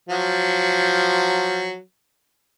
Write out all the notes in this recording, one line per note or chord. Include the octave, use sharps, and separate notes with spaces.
F3 F#3